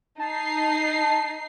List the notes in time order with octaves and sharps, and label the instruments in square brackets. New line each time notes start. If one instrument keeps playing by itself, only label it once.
[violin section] D#4 C7 [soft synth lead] A5